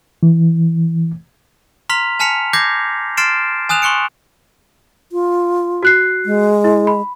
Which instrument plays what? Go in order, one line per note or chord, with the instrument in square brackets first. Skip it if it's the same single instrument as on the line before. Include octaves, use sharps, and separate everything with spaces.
[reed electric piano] E3
[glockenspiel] A#5 C6 F6 B6 F7
G#5 A5 F6 B6 C#7 F7
D6 G6 G#6 A#6 C7
C6 F6 A6 C7 D7 E7
G#5 D#6 F#6 E7 F7
C6 C#6 F#6 C#7 D7
[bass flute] F4
[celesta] F#4 F#6 C7
[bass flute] G#3
[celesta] E4
B5